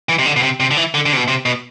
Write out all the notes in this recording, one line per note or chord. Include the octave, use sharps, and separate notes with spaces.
E3
C3
D3
B2
C3
C3
D3
E3
D3
D3
C3
B2
C3
B2